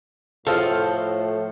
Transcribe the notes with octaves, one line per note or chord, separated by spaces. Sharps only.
A2 F3 A4 C5 D#5 F5